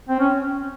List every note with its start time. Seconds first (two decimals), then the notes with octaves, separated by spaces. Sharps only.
0.09 C4
0.20 C#4